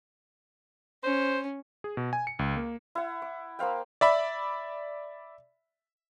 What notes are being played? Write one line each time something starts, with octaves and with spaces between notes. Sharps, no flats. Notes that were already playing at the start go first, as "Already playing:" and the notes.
C#4 C5
G#4
B2
G#5
C#7
C#2
A#3
E4 F#5
D6
A#3 C5 F5 G5
D5 E5 B5